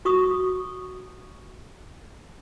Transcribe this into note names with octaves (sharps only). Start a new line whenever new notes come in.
F#4 C#6 D#6